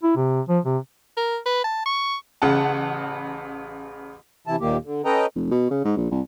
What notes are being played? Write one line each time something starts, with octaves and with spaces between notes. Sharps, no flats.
E4
C3
F3
C3
A#4
B4
A5
C#6
A1 C#3 F#5 A5
C3 E3 E4 A5
D#2 A#2 D#3 A#3 G4
D3
C#4 A4 B4 D#5 G5 A#5
F1
B2
C#3
G#2
A#1
C2